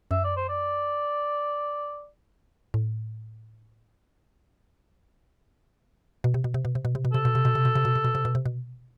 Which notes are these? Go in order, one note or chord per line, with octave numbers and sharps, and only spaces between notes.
F#2 E5
D5
C5
D5
A2
B2
C3
B2
C3
B2
C3
B2
C3
B2
C3 A4
B2
C3
B2
C3
B2
C3
B2
C3
B2
C3
B2
C3
B2